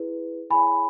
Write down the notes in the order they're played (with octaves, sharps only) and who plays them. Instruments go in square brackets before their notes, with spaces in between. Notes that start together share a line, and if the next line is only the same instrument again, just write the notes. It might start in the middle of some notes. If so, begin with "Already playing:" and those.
Already playing: [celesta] E4 G#4 B4
E4 G#4 C#5 G#5 B5